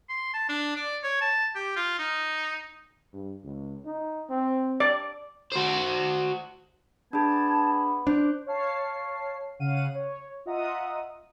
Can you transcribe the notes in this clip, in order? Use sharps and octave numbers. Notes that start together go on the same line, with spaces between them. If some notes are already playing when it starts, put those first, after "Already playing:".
C6
A5
D4
D5
C#5
A5
G4
F4
D#4
G2
C#2
D#4
C4
D5
F#4 C5
B3 D4 G#4 A5 G#6
D4 C5 D6 G6
C#5 F5 A5 C7
C#3 F5 F#5 D#7
C#5
F4 D#5 E5 F#5 A#5 D#6